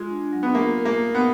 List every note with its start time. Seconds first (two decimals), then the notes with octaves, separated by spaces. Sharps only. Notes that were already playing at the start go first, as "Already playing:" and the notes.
Already playing: G#3 F4
0.10 D4
0.33 F#3
0.43 B3
0.54 A#3 F4
0.78 A#4
0.85 A#3
1.00 A#4
1.15 B3